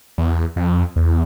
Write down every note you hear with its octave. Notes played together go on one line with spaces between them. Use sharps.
E2
F2
E2